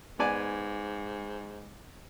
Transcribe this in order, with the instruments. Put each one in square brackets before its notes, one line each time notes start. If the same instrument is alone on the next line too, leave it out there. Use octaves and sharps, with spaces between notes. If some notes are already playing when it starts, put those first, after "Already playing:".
[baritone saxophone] G#2 [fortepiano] B3 D5 G#5